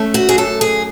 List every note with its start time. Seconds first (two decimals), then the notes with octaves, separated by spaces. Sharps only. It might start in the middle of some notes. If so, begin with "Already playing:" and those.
Already playing: A3 C#4
0.14 F#4
0.29 G#4
0.38 F#2 A4
0.61 G#4